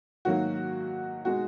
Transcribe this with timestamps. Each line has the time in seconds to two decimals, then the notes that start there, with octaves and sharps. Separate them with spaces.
0.25 G#2 D#3 F#3 A#3 F#4
1.25 B2 G#3 D#4 F#4